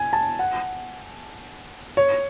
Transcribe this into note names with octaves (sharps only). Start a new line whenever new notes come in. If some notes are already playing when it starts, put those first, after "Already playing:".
Already playing: G#5
A5
F#5
C#5